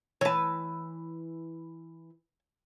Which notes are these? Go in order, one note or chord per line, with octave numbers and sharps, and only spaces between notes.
E3 B4 C#5 A5